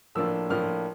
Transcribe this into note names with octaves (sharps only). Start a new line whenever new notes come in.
A2 F3 A#3 D4 F4 E6
A2 F3 A#3 D4 F4 F6